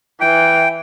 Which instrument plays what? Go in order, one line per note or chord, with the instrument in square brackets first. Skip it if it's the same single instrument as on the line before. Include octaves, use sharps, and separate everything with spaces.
[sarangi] E3 [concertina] G5